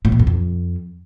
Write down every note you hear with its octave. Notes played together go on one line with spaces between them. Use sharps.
A2
A#2
F#2
F2